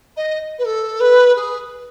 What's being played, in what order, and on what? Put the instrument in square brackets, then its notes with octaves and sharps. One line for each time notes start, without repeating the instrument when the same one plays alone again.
[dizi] D#5
B4
A4
B4
G#4